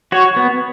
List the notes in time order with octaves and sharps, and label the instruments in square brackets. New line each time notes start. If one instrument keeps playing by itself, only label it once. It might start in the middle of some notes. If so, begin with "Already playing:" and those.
[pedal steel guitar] F#4 C#5
B3